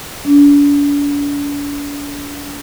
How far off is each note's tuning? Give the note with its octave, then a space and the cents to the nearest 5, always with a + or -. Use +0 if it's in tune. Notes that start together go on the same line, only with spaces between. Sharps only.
D4 -40